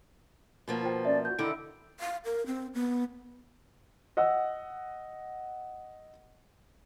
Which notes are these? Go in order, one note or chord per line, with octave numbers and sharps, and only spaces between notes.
B2 F3 A#3
F4 C5 G5
C#4 D5 E5
F#4 G6
D3 D#3 E4 D7
F5
A#4
C4
B3
D#5 F#5 E6